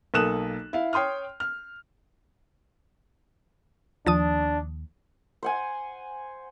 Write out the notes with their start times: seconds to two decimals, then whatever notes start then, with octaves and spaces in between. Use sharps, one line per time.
0.14 B1 A#3 A4 D#6 F#6 E7
0.73 E4 F5
0.93 C#5 G5 C6 D#6 F6
1.40 F6
4.06 D#2 F3 D4 A5 D#6
5.43 C5 F#5 G#5